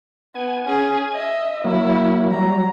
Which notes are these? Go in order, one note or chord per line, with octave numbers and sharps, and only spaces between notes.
B3 G#5
C#4 G#4
D#5 E5
F#3 A#3 E4
F#3 G3 A#5